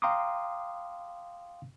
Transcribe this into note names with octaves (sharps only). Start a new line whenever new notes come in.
F5 G5 A#5 C6 D6 D#6